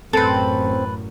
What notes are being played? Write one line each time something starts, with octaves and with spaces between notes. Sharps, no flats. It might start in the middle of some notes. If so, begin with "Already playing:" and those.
A1 F#2 C4 A4 B4